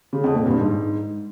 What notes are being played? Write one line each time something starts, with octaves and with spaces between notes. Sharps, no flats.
C#3
F2
A#2
G2
G#2